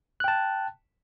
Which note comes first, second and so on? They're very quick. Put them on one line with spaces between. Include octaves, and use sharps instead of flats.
F#6 G5 A5